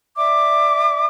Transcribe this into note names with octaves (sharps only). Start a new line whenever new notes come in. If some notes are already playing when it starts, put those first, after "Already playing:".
D5 E5 D6